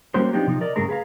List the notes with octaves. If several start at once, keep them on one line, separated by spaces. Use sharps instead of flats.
G3 A#3 C#4 F#4 A#4 C5
F3 B3 C4 D4 D#4 G4
C3 F3 D#4
A#4 D5 D#5
G2 C#3 A3 G#4 A#4 A#5
G#4 B4 F5 A#5